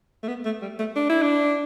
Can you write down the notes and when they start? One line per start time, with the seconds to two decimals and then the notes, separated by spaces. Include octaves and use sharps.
0.23 A3
0.28 B3
0.45 A3
0.62 G3
0.79 A3
0.96 D4
1.10 E4
1.22 D4